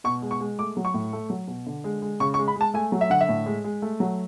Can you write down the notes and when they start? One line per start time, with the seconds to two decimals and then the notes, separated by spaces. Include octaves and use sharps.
0.04 B2 C#6
0.22 G#3
0.31 C#6
0.40 G#3
0.59 A3 D6
0.77 F#3
0.85 C#6
0.94 A2
1.13 A3
1.30 F#3
1.48 B2
1.66 D3
1.84 G#3
2.02 G#3
2.20 C#3 C#6
2.34 C#6
2.39 G#3
2.48 B5
2.56 G#3 A5
2.74 A3 G#5
2.92 F#3
3.01 E5
3.10 D3 F#5
3.21 E5
3.28 A2
3.46 G#3
3.64 G#3
3.82 A3
4.00 F#3